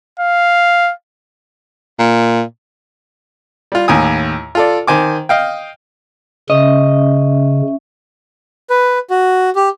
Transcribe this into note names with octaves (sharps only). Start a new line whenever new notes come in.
F5
A#2
G3 F4
D#2 A2 G#5 D#6
F4 A4 D5
D#3 C5 G#5 D6
D#5 F5 G5
C#3 C#4 D#5 E5
B4
F#4
G4